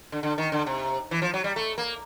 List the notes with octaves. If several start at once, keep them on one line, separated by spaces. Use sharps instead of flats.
D3
D3
D#3
D3
C3
E3
F3
F#3
G3
A3
A#3